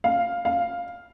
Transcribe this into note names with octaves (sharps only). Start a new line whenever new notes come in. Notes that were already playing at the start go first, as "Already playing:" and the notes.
F5
F5